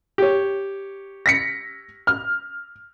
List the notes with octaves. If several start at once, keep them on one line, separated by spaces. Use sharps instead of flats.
G4 C#5
A#6 B6 C#7
F6